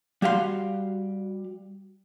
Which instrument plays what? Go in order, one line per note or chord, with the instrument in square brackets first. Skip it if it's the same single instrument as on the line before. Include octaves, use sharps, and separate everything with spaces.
[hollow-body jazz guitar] G3 F#4 G4 F5 F#5 C6